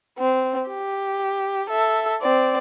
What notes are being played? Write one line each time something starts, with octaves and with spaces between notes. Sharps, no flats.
C4
G4
A4 E5
C4 D5